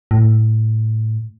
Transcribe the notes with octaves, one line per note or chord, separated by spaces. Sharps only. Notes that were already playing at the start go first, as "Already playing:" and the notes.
A2